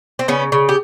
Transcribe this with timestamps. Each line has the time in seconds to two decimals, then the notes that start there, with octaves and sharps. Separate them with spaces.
0.19 C4
0.28 C#3 B3 C#4
0.52 C#3
0.69 G4